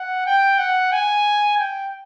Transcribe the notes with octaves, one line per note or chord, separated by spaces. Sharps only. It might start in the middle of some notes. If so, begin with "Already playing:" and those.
Already playing: F#5
G5
F#5
G#5
G5